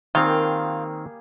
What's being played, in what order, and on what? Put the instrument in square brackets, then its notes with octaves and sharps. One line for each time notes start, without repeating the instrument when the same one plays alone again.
[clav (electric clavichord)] D#3 C4 [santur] G3 A#3 G#4 [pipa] F4